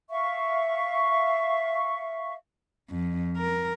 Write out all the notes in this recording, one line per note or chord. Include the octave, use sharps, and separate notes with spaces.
E5 F5 C#6
F2
A#4